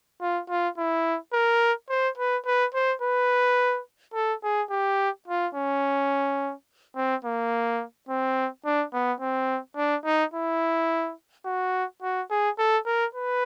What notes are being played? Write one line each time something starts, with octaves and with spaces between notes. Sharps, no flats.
F4
F4
E4
A#4
C5
B4
B4
C5
B4
A4
G#4
G4
F4
C#4
C4
A#3
C4
D4
B3
C4
D4
D#4
E4
F#4
F#4
G#4
A4
A#4
B4